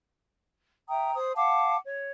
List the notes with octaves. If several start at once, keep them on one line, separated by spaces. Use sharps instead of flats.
E5 G5 A#5 D#6
C5 D#6
F5 F#5 A5 D6
C#5